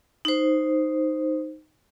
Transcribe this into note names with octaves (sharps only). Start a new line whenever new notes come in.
D#4 C5